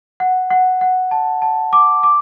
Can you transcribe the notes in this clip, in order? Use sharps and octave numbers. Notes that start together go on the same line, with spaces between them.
F#5
F#5
F#5
A5
A5
D6
D6